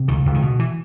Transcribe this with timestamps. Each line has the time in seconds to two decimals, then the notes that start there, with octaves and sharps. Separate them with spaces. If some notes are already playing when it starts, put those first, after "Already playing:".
Already playing: C3
0.08 C#2 D#3
0.25 C#2
0.34 D#3
0.42 B2
0.59 E3